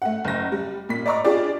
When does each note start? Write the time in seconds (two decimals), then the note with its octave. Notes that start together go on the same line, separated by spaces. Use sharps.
0.02 A3 F#5
0.25 F#1 A#6
0.52 G3
0.89 A#2 B6
1.06 D5 D#5 A#5 C#6 D6
1.24 D4 F4 G4 G#4 D5